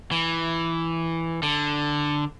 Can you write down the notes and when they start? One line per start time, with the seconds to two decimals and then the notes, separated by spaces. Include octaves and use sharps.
0.12 E3
1.43 D3